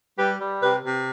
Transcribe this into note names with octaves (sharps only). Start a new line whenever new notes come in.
G3 G4 B4
G3
C3 G4 B4
C3